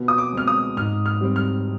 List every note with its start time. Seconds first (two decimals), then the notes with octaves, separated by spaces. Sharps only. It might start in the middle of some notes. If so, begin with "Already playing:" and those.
Already playing: B2
0.08 D#6
0.18 D6
0.33 G#3 C4 F6
0.47 D#6
0.76 G#2 F6
1.06 F6
1.21 G3 C4
1.36 F6